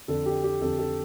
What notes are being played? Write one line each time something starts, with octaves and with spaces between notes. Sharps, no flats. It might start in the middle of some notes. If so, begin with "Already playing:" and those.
F2 D3 A4
G4
G4
F2 D3 A4
A4